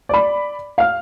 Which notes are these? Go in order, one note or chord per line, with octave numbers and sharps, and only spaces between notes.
D5 B5
F5 F6